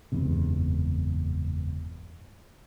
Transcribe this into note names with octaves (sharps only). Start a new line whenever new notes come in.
F#1 E2 G#2 C3